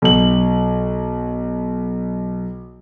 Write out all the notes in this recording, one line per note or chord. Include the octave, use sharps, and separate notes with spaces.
B1 F#7